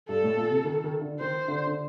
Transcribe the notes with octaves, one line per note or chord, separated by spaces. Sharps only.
G2 A4
A2
A#2
C3
D#3
D#3
D3
D#3 C5
D3
D3